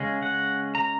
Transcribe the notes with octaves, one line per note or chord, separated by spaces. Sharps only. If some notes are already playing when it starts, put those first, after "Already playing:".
Already playing: C#3 G#3 C#4
F#5
A#5